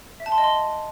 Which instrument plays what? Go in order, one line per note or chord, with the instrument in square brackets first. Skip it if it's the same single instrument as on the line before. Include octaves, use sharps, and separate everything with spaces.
[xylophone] E5
A5
C6
D#5
C6